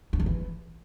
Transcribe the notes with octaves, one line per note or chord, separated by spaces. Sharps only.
D4
D#3
E3